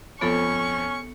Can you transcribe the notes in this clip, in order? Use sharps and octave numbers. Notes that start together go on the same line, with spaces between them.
F2 F3 B3 C#4 A4 C#5 C#6